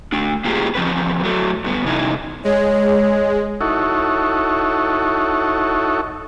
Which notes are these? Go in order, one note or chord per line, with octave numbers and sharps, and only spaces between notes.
A3 D4
A#3 F4 G4 G#4
E3 F3 C4 B4
F#3 A3
G2 B3
C3 E3 D#4 E4
G#3 C#5
D#4 E4 F#4 A4 C#5